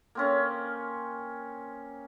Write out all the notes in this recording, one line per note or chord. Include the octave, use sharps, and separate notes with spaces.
A#3 C4 C#4